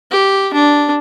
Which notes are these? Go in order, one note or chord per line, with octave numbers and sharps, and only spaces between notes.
G4
D4